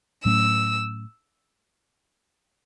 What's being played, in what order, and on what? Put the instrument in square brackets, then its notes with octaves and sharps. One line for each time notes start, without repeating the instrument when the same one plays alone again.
[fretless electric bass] A2 F#3 A3 C#4 [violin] E6